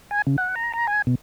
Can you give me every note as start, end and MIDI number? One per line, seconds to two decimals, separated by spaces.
0.11 0.22 80
0.27 0.36 49
0.38 0.55 78
0.56 0.72 82
0.74 0.87 82
0.87 1.02 80
1.07 1.15 47